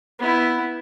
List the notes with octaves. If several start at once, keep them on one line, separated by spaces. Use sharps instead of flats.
B3 E4